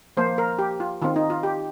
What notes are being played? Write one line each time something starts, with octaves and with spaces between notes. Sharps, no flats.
F3 A#3 C5
A#4
G4
F4
D#3 C4 F4
D#4
F4
G4